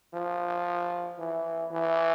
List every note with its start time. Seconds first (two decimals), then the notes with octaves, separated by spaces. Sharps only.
0.14 F3
1.19 E3
1.71 E3